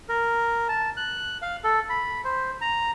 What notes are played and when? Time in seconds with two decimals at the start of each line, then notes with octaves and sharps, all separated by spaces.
0.09 A#4
0.69 A5
0.97 F#6
1.42 F5
1.64 A4
1.89 B5
2.25 C5
2.61 A#5